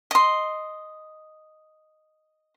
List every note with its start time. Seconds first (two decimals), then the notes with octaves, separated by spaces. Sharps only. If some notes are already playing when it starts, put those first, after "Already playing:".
0.11 D#5 C6